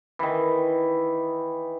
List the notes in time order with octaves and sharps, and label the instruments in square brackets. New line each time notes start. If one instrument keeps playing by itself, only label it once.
[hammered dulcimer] D#3 E3